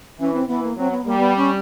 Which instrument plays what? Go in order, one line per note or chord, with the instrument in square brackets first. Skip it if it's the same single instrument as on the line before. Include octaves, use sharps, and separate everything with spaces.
[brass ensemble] E3 [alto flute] C#4
[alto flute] C4
[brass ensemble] E3 [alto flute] B3
[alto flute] A#3
[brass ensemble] F#3 [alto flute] C4
[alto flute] B3
[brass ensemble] G3 [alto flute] A#3
[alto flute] B3
C#4